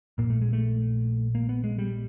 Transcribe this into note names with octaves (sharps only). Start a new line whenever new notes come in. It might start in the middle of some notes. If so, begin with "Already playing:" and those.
A#1 A#2 A#3
A3
G#3
A3
A#3
B3
G#3
G3